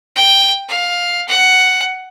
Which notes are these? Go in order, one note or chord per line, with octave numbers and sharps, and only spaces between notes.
G5
F5
F#5